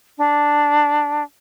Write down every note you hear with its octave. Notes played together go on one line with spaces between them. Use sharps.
D4